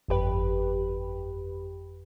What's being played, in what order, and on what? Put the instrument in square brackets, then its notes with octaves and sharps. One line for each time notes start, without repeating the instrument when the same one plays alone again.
[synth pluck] G1 F2 G4 B4